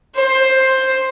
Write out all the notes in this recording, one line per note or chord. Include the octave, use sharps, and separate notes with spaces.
C5